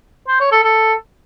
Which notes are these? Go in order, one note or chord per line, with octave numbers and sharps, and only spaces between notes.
C5
C#5
A4
A4